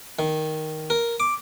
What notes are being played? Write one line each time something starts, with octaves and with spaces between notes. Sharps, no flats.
D#3
A#4
D6